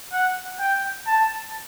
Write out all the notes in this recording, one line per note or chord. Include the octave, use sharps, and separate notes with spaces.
F#5
G5
A5